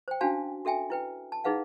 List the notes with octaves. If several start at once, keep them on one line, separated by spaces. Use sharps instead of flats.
C5 G5
C#4 D4 F#4 F5 G#5 A5
F#4 A4 E5 G5 G#5
E4 B4 G5
A5
D#4 E4 G#4 B4 F5 F#5